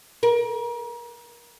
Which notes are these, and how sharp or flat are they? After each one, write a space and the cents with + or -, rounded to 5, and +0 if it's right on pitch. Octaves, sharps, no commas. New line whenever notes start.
A#4 +35